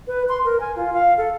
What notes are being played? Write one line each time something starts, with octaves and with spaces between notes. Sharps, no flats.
B4
C6
A#4
G#5
F4
F5
A4